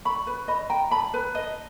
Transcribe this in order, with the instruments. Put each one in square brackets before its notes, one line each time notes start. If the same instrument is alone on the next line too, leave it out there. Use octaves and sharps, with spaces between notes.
[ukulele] B5 [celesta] C#6
[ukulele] B4
[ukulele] D#5 [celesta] B5
[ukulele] G5 [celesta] A#5
[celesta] A5 [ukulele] B5
[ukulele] B4
D#5